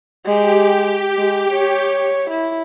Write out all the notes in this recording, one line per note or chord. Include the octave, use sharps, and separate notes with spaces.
G#3 G4
G#3
C#5
E4